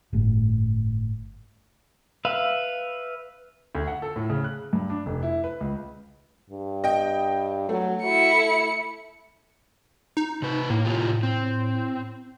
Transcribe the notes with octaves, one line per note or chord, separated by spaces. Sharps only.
G1 A2
B4 E5 F5
D2
F#5
A4
A2
C#3
F#6
G2
D4
F1
E4
B4
C#2
G2
D#5 G5
F#3 A3
E4 F#4 C#7
A4
D#4
C3 B4
A2 A#3
C3 D#3 F4
C4